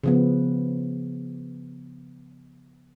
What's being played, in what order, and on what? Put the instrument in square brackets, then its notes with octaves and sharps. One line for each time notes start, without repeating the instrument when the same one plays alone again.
[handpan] C#3 F3 B3